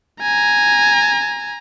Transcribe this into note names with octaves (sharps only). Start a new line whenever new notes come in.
G#5 A#5